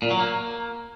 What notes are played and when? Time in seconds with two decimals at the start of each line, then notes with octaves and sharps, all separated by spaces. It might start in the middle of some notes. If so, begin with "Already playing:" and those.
0.02 A#2
0.11 F#3
0.19 A#3